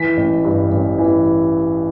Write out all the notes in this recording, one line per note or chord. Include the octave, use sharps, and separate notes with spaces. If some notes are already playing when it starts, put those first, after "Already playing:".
Already playing: E3 B6
A1
G2
A1
E3